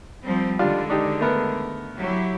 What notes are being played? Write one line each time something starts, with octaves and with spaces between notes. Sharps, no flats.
F3 G3 C4
D3 D#3 G3 G#3 D4 F4
D4 D#4 G4
A3 B3 A#4
F#3 E4 G4